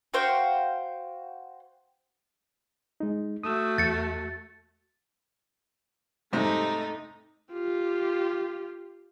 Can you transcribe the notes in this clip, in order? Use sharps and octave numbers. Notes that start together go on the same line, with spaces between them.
F#4 C5 F5 G5
G#3 D#4
A3 F#4 D#6 E6
E2 A6 C#7
G#2 C3 G3 A3 D#4
F4 G4